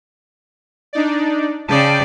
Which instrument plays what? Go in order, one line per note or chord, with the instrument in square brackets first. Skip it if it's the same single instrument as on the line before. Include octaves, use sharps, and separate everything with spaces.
[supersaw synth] D4 D#4 D5
[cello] C#3 D5 [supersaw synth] G5 A5